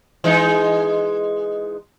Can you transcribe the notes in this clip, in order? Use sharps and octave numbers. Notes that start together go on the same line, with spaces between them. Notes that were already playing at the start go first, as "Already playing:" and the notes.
E3 G#3 D#4